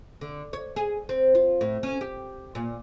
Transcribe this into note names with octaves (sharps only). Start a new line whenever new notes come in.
D3
C#5
G#4
C4
F4
A2
C#4
G4
A#2